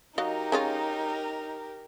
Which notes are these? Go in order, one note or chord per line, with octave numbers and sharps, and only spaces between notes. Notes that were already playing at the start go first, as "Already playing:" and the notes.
F#3 D#4 G4 A#4 D#5 F5
G#3 C#4 F4